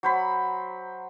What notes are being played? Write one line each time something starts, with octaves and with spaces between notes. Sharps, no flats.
F#3 C5 B5